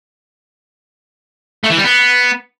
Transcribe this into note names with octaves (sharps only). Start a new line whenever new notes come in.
A3
E3
G3
B3